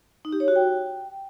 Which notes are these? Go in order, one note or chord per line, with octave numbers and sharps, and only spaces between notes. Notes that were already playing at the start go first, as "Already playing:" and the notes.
D#4
G4
C#5
F#4
G5